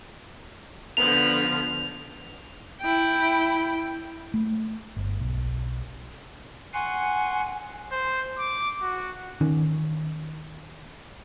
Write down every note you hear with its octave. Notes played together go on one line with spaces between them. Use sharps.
D3 F3 B3 F7
E4 G5
A3
G1
B1
F#5 G#5 C6 C#6
C5
D6
F#4
D#3 C#4